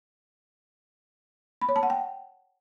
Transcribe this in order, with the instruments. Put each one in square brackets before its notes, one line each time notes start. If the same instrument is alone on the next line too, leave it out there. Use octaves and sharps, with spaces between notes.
[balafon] B5
C#5
A5
F#5
G5